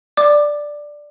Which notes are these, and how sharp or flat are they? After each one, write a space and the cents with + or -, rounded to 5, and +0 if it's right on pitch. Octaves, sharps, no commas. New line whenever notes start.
D5 +0 D6 +20